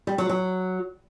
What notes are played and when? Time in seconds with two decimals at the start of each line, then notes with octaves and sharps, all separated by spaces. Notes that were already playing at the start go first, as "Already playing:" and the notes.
0.07 G3
0.18 F#3
0.29 F#3